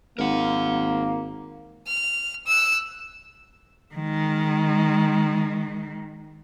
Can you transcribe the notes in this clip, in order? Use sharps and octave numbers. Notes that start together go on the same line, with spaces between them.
G#1 A#3 A#4 F#5
F6
E6 F#6
D#3 G#3